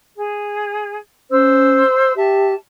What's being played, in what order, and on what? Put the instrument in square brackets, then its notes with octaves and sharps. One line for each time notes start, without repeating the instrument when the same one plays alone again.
[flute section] G#4
[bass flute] C#4 [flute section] C5 E6
[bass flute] G4 [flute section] E5 A5